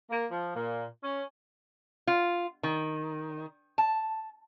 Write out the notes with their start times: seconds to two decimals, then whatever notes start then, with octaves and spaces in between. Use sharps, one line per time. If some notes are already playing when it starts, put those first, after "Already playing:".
0.10 A#3
0.31 F3
0.56 A#2
1.03 C#4
2.07 F4
2.63 D#3
3.78 A5